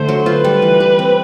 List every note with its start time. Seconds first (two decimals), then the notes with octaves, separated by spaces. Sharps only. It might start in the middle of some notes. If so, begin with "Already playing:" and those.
Already playing: D3 A3 C5
0.09 F#3
0.26 F4 B4
0.44 G3
0.62 E3
0.80 G4
0.99 C4